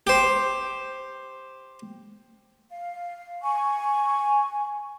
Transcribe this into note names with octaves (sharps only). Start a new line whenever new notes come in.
G4 C5
F5
G#5 C#6